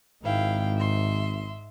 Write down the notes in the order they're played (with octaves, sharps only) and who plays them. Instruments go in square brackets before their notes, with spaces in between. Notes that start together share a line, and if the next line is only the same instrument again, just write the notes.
[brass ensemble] G#1 [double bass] G#2 [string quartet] E4 F5 G5
[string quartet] E5 C6